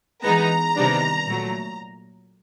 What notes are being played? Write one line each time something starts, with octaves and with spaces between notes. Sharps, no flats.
E3 G#3 B3 D#4 A#5
C3 D#3 G3 B3 D4
A#2 F#3 A3